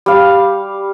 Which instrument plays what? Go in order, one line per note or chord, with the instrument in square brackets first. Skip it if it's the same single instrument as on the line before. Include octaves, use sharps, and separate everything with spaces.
[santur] G3 F5